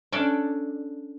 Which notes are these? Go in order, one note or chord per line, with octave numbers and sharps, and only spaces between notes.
C#4 D4 A4 D5